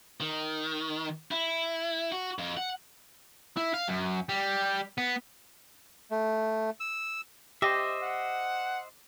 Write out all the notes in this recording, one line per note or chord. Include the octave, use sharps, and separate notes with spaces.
D#3
E4
F#4
F2
F#5
E4
F5
F#2
G3
B3
A3
E6
G4 C5 D#5 E5 D6 A#6
F#5